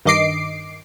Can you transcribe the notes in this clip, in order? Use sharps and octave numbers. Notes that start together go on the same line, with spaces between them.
G2 D#3 D#5 D6 C7 D7